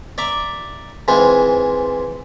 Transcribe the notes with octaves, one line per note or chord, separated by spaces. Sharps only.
D5 E5 A#5 D6
G#2 E3 G#3 C4 F4